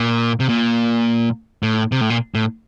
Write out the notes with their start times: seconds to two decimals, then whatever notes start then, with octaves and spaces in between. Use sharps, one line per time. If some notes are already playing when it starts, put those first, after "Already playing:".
Already playing: A#2
0.40 C3
0.49 A#2
1.63 A2
1.92 C3
2.01 A2
2.10 A#2
2.35 A2